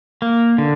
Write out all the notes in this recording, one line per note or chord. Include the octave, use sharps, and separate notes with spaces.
A#3
D3